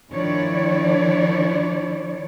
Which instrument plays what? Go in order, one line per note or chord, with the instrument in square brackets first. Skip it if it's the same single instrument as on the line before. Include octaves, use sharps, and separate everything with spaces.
[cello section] D#3 F3 D4 E4 C#5 D5